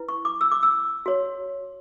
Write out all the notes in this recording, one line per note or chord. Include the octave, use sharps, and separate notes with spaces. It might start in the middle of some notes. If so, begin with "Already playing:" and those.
Already playing: E4 B4
C#6
D6
E6
D6
E6
F#4 C#5